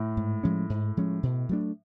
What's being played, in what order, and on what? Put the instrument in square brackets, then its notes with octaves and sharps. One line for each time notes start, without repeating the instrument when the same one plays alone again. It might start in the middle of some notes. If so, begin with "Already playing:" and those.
Already playing: [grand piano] A2
[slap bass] G#2
F3 G#3 C#4
G#2
F3 G#3 C#4
B2
F#3 A3 D4